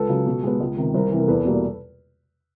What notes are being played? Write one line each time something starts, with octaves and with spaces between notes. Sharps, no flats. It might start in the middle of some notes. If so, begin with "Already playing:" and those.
Already playing: C#2 A4 B4
C#3 F#3
B2
G#3 B3
C#2
C3 D#3
C2 A#4 C5
C3 E3
A#4
E2 A4 B4
B2 G3 A#3